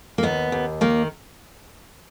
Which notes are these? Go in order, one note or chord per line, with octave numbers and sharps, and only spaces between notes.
A#3
D#2 B3
D#2
D#3 A#3